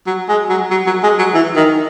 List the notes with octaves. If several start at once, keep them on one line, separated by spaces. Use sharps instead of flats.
F#3
G#3
F#3
F#3
F#3
G#3
F#3
E3
D#3